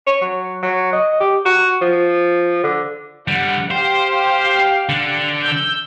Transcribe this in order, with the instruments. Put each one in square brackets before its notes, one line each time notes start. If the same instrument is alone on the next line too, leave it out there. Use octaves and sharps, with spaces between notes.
[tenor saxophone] C#5
F#3
F#3
D#5
G4
F#4
F3
D3
[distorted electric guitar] D3 G3 [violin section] F#5
[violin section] G4 F5 [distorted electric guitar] C5
[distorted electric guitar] D3 D4
[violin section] E6 G6